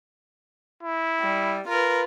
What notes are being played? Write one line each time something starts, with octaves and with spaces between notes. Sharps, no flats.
E4
G3
F4 A#4 B4